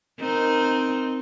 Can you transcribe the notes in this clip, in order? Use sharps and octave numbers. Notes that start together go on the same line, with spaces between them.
C4 D#4 A#4